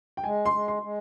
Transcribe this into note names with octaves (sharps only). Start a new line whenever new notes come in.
G5
G#3 G#5
C6
G#3
C6
G#3